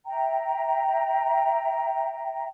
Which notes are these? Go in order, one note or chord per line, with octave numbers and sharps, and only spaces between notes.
E5 G5 A#5